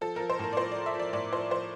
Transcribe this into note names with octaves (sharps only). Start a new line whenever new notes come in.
F3 A4
F3 A#4
C5
A2 A#4
D5
F3 C5
F3 D5
E5
F3 D5
A2 D5
F3 C5
F3 C5